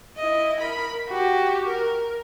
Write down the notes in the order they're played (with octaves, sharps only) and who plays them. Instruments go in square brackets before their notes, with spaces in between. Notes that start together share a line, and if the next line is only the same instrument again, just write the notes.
[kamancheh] E4 D#5
A#4 B5
F#4 G4
A#4